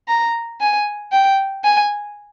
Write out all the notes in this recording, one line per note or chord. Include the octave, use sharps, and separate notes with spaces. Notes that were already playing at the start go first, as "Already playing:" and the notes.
A#5
G#5
G5
G#5